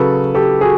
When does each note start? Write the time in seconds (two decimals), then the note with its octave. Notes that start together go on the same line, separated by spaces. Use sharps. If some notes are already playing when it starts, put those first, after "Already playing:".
Already playing: C#3 F#3 A4 B4
0.35 G4 A4
0.61 F#4 G#4